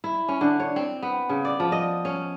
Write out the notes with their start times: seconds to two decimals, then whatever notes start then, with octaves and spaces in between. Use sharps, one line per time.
0.04 E4
0.28 C#4
0.41 D3
0.60 C#5
0.76 C4
1.03 B3
1.29 C#3
1.45 D5
1.60 F3
1.72 D#5
2.05 C#4